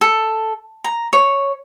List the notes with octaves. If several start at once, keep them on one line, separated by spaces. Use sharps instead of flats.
A4
A#5
C#5